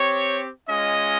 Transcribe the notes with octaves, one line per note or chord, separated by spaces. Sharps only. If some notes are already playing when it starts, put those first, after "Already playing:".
Already playing: C4 G4 C#5
G#3 C#4 F4 D#5